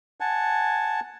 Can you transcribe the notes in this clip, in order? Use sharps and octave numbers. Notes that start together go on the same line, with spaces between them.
F#5 G#5 A5